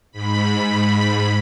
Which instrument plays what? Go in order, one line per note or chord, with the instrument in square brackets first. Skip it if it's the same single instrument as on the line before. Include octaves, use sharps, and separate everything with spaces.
[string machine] G#2 B5